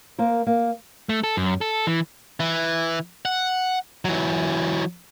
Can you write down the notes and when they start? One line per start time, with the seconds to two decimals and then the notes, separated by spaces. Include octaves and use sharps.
0.18 A#3 A#4 C5
0.47 A#3
1.09 A3
1.23 A4
1.37 F#2
1.61 A4
1.87 E3
2.40 E3
3.25 F#5
4.05 E3 F#3